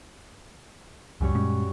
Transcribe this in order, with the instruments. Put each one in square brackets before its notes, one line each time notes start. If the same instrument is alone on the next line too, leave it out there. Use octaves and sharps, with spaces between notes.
[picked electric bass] C#2 [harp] F#2 G3 C#5
[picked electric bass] A#2 G#3 C#4